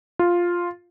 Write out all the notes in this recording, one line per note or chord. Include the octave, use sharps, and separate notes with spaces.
F4